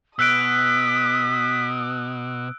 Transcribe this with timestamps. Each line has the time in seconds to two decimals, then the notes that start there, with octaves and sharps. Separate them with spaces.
0.19 B2 D#6 E6 F#6 B6 D7